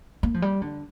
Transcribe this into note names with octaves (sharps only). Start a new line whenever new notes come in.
A#3
F3
G3
D3